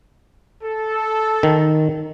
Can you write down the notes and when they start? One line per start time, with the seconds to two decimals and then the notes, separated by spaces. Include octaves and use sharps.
0.63 A4
1.43 D#3